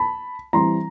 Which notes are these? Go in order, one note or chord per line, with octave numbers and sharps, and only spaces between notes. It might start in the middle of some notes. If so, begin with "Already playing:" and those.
Already playing: A5 B5
E3 G3 C4 A#5 C6